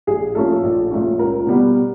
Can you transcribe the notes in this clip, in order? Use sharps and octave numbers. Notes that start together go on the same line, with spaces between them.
A#1 G#4
A#2 F3 A3 C#4 A4
A#1
A#2 F3 A3 C#4
C#2 A#4
B2 G3 B3